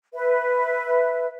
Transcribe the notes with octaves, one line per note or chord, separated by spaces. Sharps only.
B4 E5